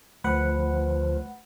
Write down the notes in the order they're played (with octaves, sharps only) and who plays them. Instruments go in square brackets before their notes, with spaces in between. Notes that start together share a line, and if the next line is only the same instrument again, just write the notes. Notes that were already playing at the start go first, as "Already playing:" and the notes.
[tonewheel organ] D2 F3 [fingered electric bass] A3 [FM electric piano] B4 F#5